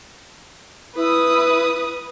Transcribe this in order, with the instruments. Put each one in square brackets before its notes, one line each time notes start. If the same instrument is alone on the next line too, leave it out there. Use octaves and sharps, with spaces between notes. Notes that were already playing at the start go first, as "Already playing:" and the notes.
[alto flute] E4 [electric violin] B4 D#6